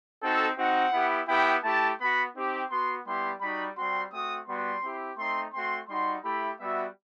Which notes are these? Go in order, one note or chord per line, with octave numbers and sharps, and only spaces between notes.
C4 D#4 F#4 A4
C4 D#4 F#4 F#5
B3 E4 G4
B3 E4 G4 G5
A3 E4 G4 A5
B3 F#4 B5
C4 D#4 G4
B3 F#4 C6
G3 B3 E4 G4 C6
G3 D#4 F#4 B5
G3 C4 F#4 C6
A3 C4 F#4 D#6
G3 B3 F#4 C6
C4 E4 G4
A3 C4 D#4 C6
A3 C4 F#4 C6
G3 D#4 F#4 C6
A3 E4 G4 B5
G3 B3 F#4 E5